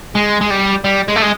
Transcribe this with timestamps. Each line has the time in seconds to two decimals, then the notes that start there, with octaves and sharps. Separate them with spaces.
0.15 G#3
0.41 G#3
0.50 G3
0.84 G3
1.08 G#3
1.16 A3
1.22 G#3